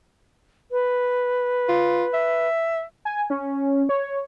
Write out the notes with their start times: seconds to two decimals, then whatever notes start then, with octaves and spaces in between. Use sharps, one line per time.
0.72 B4
1.69 F4
2.14 E5
3.05 G#5
3.30 C#4
3.89 C#5